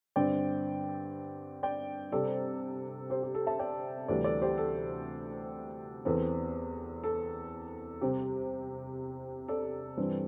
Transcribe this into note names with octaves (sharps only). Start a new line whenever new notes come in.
G2 D3 C4 D5 G5
D5 G5
C3 G3 C4 A4 D5
G4 C5
G4
A4
E5 A5
D5 G5
D2 C3 E3 G3 A4 D5
A4 D5
G4 C5
A4
E2 E3 C4 A4
A4
C3 G3 C4 G4
A4 D5
G2 E3 G3 C4